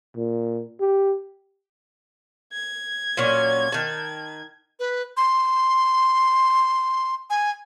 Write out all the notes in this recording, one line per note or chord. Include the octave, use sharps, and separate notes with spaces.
A#2
G4
G#6
A#2 F#3 C#4
D#3 A5
B4
C6
G#5